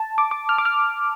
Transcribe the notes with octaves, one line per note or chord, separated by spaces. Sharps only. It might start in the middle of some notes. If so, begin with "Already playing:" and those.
Already playing: A5
D6
D6
F6
D6
F6